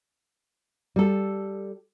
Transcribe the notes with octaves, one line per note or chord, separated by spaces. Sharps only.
G3 A4